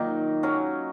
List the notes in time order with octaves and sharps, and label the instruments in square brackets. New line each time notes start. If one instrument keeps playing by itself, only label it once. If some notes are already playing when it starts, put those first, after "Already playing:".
Already playing: [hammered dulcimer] A#2 D#3 F#3 A#3 D#4
F#3 C#4